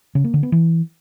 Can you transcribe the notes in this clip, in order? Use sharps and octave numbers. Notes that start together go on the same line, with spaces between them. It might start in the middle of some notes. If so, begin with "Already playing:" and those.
C#3
A#3
D3
B3
E3